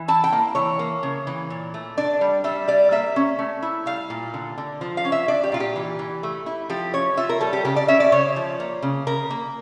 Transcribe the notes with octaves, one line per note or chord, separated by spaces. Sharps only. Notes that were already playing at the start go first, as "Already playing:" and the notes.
Already playing: E3
E4 A5
G5
A#3
E3 C#5
A#3
C#3
E3
A#2
A3
D4 D5
G3
G3 E5
G3 D5
A#3 E5
C#4
A3
E4
G3 F5
A#2
D3
D3
F3
F5
C#4
E5
D4 D5
G4
A#2 F4
G4
E3
E3
A3
E4
F3 G4
C#4 C#5
F4 E5
A#4
G3 A4
G4
C#3 G4
D5
C#4 E5
D5
C#3 C#5
F3
A#3
C#3
C#3 A#4
A#3